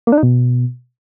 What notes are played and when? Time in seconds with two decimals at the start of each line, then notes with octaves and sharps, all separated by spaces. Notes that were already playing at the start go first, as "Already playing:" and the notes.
0.07 A#3
0.12 D4
0.18 D#4
0.23 B2